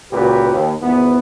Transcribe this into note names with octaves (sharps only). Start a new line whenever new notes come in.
C#2 A#2 F#4 G4 B4
D#2
G#1 E2 G#2 B3